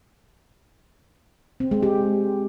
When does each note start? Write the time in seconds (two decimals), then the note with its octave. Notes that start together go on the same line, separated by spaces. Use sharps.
1.60 C4
1.71 G#3
1.83 G4